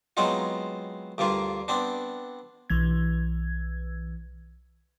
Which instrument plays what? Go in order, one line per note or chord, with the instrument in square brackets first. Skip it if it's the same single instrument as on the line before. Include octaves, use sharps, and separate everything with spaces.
[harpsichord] F#3 G#3 B3 C4 D#4 F4
D2 G2 A#3 F4
B3 C4 D4
[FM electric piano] B1 E3 G#6